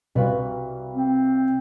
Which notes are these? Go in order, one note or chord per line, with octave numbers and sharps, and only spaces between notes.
C2 C3 F#4 B4 F5
C4